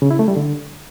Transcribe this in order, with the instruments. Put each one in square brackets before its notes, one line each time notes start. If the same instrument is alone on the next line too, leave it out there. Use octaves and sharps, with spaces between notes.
[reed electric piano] C#3
E4
A3
G3
D3